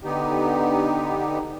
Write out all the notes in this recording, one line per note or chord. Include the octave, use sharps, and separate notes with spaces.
D3 B3 D#4 G4